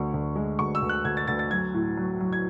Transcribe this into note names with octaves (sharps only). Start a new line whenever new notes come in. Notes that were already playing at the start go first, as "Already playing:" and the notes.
Already playing: D2 D3 C#6
D2
G#3
D2 C#6
E6
D2
F#6
D2 G#6
A6
D2 A6
A6
F#3 G#6
A2
F#3
F#3
G#6